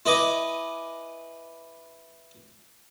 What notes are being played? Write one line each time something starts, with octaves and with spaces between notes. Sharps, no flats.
E4 B4 D#5 G#5 D6